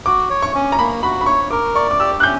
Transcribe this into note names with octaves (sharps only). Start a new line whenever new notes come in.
F#4 D6
C#5
C#6
C#4
A#5
A#3 B5
F#4 B5
B5
C#5 C#6
A#4 D6
D5 C#6
D6
G4 E6
F#6
C#4 G6